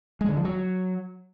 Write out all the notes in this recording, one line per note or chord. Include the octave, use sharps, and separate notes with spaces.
G#3
D3
F3
F#3